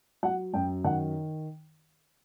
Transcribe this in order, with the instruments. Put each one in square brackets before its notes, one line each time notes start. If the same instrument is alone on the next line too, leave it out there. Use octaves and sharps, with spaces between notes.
[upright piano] F#3 F#5
F#2 G5
D#3 F#5